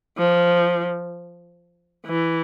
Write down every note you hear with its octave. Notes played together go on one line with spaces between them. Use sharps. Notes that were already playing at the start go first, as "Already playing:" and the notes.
F3
E3